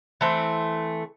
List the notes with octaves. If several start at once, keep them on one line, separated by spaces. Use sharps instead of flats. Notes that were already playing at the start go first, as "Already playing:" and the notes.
E3 A3 C4